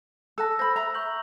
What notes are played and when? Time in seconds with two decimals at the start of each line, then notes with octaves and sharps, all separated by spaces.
0.38 A4 A5 E6 F#6 A#6
0.59 C5 B5 A#6
0.76 E5 A#5
0.95 C#6 G6 F#7